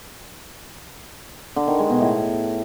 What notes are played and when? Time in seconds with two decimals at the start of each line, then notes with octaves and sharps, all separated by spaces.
1.56 D3
1.68 D#3
1.79 G#3
1.90 B2
2.01 A2